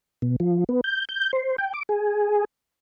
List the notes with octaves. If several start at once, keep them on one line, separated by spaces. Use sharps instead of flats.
B2
F3
B3
G6
G6
C5
G5
D6
G#4